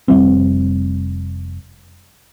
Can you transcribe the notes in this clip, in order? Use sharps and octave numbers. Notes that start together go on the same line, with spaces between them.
F1 G#2 G3 C4